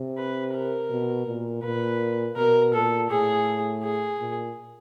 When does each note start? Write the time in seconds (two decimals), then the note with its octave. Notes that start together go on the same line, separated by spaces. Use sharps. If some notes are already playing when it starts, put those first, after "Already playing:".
Already playing: C3
0.17 B4
0.53 A#4
0.90 B2
1.27 A#2
1.63 A#2 B4
2.37 B2 A#4
2.73 A#2 A4
3.10 A2 G#4
3.83 G#4
4.19 A#2